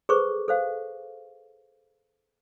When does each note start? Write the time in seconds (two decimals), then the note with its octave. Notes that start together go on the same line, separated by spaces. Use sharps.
0.09 G#4 A4 B4 C5 C#6 D6
0.48 A4 C5 F5